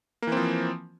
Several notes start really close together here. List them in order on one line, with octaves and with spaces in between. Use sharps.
A#3 E3 C4 F3